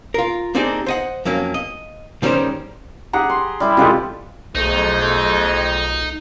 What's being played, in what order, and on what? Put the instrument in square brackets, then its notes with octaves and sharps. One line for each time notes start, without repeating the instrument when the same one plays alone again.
[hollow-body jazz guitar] F4 A#4
A#3 C4 D4 D#4 G4 G#4
C5 D#5 F#5
F2 F#3 A#3 C#4
D#5
G#2 D#3 G3 C#4 A#4 C5
[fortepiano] G4 F#5 A#5 [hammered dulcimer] G#4
[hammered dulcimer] C6
G3 E4 B4
[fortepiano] C3 F4 G4 [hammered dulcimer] E3 G#3 A4
[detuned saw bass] B1 [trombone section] F2 [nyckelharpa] A3 G#4 [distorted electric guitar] D#4